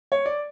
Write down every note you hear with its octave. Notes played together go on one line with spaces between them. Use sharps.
C#5
D5